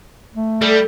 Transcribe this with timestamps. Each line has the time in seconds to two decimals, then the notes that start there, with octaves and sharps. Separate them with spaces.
0.35 A3
0.62 G3 A4